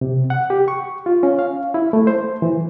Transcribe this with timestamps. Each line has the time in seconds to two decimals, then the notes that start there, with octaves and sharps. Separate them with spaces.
0.01 C3
0.30 F#5
0.50 G4
0.68 C#6
1.06 F4
1.23 C#4
1.39 F5
1.74 E4
1.93 A3
2.07 C5
2.42 E3